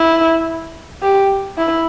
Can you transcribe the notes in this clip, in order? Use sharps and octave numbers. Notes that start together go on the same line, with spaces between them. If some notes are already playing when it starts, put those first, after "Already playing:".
Already playing: E4
G4
E4